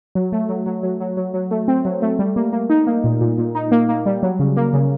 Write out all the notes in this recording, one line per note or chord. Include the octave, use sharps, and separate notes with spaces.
F#3
A3
F#3
F#3
F#3
F#3
F#3
F#3
A3
C4
F#3
A3
G3
A#3
A#3
D#4
A#3
A#2
A#2
A#2
D#4
A#3
A#3
G3
F#3
C#3
A#3
C#3